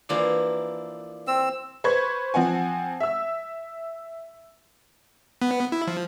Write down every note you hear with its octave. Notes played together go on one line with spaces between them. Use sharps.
E3 F3 A#3 D4 E4
C4 E6
B4 C5 B5 C#6 G#6
F3 C4 F#5 G#5
E5 E6
B3
E4
F3